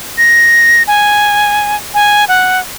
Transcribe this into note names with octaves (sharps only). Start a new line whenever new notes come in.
A#6
G#5
G#5
F#5